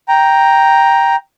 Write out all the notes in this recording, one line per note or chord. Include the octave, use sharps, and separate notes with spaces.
G5 A#5